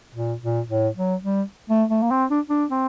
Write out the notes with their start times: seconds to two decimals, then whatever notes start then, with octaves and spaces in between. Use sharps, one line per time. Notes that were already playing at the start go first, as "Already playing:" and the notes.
0.15 A#2
0.42 A#2
0.69 A2
0.96 F#3
1.23 G3
1.70 A3
1.90 A3
2.02 A#3
2.11 C4
2.31 D4
2.50 D4
2.71 C4